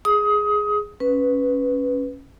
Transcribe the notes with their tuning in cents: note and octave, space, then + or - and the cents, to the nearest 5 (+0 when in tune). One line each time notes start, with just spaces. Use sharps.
G#4 +0 D#6 +25
C#4 +0 B4 +0